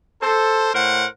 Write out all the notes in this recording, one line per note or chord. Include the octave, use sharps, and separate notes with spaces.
A4 C5
A2 A#4 C5 F#5